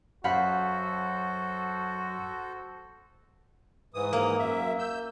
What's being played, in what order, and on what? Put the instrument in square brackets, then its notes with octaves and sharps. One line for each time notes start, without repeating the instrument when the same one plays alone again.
[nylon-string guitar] F#2 [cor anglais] F#4 [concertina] A4 C5 [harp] F5 F#5 B5
[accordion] G#2 E3 D#6
[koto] A#3
[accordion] F#2 E5
E6 G6